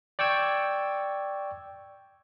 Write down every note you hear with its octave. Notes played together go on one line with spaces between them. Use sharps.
D5 G5 C#6 E6 G#6